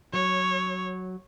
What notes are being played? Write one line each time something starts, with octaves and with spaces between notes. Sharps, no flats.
F#3 C#5